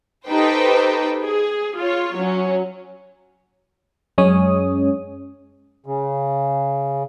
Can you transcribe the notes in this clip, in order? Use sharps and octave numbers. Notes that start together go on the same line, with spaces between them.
D#4 G4 A4 B4 C5 G5
G#4
F4 C#5
F#3 C#4
F#2 G#3 C#4 C#5 D#6
C#3